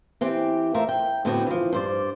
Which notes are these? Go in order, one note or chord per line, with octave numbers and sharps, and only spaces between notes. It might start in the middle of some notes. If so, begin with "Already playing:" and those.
E3 C4 G4
A3 A#4 C5 E5 F5
G5
A2 D3 B3 C4 F#4 G5
E3 F3
G2 C5 D5